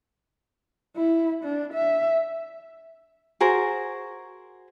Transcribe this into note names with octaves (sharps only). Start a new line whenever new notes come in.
E4
D4
E5
F#4 G#4 A#4 C5